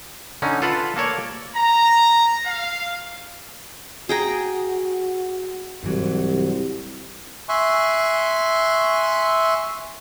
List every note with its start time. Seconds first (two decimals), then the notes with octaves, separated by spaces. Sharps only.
0.42 D3 C#4 D#4
0.62 F4 A4 B4 F#5
0.96 A#3 A4 C#5 D5
1.55 A#5
2.45 F5
4.09 F#4 G#4 G5 A#5
5.84 C2 G#2 E3 F#3 F#4
7.49 E5 G#5 C6 C#6 F#6